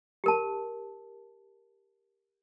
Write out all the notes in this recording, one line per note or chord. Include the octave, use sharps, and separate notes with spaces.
G4 A#4 A5